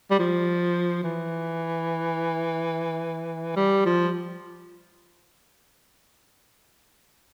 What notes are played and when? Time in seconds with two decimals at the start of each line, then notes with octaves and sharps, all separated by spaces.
0.11 G3
0.19 F3
1.03 E3
3.57 G3
3.85 F3